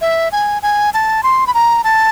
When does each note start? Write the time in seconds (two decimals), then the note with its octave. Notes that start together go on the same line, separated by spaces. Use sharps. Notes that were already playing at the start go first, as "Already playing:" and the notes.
0.01 E5
0.32 G#5
0.62 G#5
0.94 A5
1.23 C6
1.47 B5
1.54 A#5
1.84 A5